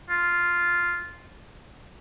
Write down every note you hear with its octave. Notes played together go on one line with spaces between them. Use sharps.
F4